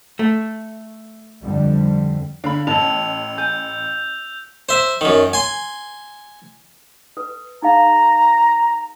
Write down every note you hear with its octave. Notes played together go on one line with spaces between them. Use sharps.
A3
F2 D3 G3
D3 F5 B5
A1 E4 D#5 A5 E6 F7
G#5 G6
C5 E5
F#2 D#3
G#5 C6
A4 B4
D#4 G#4 F5 A#5